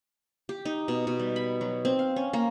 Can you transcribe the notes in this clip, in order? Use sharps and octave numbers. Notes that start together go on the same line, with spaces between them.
G4
D#4
B2
B2
G3
B5
F#3
C4
F5
C#4
A#3